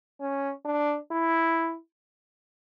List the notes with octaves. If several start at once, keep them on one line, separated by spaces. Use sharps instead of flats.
C#4
D4
E4